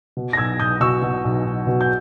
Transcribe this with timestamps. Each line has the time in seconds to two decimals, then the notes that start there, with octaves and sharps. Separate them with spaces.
0.17 B2
0.33 A#6
0.37 B1 E6 G#6
0.59 B1 D#6 G6
0.81 B2 C#6 E6
1.02 B2
1.24 B1
1.45 B1
1.67 B2
1.81 G6